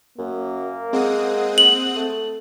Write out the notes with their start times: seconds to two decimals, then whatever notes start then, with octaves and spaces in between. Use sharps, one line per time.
0.18 F#2 A#3
0.93 G#3 C4 F#5 D#6
1.58 F#7
1.96 A3